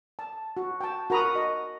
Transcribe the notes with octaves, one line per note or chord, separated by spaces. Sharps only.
A5
F#4
G5 A5
F#4 A#4 A#5 B5 D#6
D#5